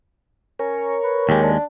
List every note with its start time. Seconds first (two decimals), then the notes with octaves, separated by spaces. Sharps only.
0.59 C#4 A#4 C#5
1.04 B4
1.29 D#2 G#3 G4
1.43 D4